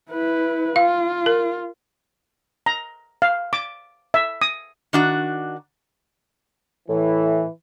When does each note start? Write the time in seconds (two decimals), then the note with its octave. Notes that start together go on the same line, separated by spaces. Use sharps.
0.11 E4 B4
0.76 F4 F5
1.26 A#4
2.66 A#5
3.22 F5
3.53 D6
4.14 E5
4.42 D#6
4.93 D#3 D4 F#4
6.89 A2 E3